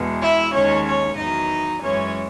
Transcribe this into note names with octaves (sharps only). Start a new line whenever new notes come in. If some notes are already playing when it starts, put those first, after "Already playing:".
Already playing: E2 B2 G#3
E4 E5
D#2 D#3 G#3 C#4 C#5
C#4 C#5
E2 D#3 F#3 D#4 D#5
F#2 E3 G#3 C#4 C#5